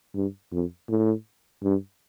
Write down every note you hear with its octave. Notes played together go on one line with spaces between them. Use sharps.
G2
F2
A2
G2